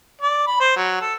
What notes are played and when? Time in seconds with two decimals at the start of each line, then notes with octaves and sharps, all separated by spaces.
0.21 D5
0.47 B5
0.60 C5
0.76 F#3
1.01 A4